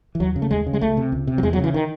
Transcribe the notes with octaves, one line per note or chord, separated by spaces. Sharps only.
E3
D#2 F#3
C#3
A3
D#2 G#3
C#3
G#3
C#2 A3
C3
C#2
C3
F#3
E2 G#3
F#3
C#3
E3
D#3